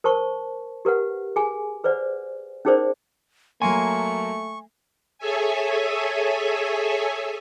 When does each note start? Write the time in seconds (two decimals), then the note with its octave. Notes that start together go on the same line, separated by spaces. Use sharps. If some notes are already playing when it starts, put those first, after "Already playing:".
0.04 A#4 C5 A5 C#6
0.85 G4 A#4 B4 F#5
1.36 G#4 G#5
1.84 G#4 B4 C5 D5 F#5
2.65 C#4 D#4 G#4 A#4 C5 D5
3.62 F#3 A3 A#3 G#5 C6 C#6
5.18 G#4 A4 C#5 E5 G#5